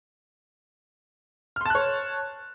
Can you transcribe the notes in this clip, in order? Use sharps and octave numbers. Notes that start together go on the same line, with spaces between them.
C#5 A5 C6 F6 F#6